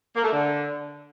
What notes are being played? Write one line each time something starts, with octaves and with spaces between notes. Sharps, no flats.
A#3
A3
D3